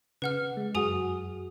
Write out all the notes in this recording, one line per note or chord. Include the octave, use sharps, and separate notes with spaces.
C#3 B4 F#5 F6
G#3
F#2 F#4 G#4 G#5 D#6